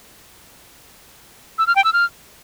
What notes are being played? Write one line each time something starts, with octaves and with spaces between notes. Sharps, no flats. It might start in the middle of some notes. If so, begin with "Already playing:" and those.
E6
F6
G5
E6
F6